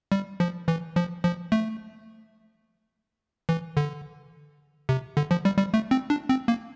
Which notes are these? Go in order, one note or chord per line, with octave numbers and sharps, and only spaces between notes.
G3
F3
E3
F3
F3
A3
E3
D3
C3
D3
F3
G3
G3
A3
C4
D4
C4
A#3